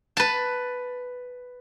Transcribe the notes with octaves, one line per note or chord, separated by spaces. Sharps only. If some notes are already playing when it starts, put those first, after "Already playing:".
B4 A5